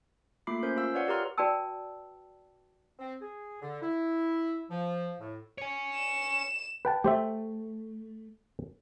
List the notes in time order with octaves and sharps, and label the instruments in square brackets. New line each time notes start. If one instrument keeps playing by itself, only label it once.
[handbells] A3 A#3 F4 B5 D6 C7
C#4 A#4 C5 G6
F4 F5 E6
F4 B4 C#5 D5 F5 F#5
G4 A#4 F5 A#5 C6 F6
[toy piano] F#4 B4 D5 G5 A5 E6
[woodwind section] C4
G#4
D3
E4
F3
A2
[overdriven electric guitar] C#5 G#5
[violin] E7
[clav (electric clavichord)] B4 G5 A5
[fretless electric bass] A3 [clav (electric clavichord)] G4 C5 E5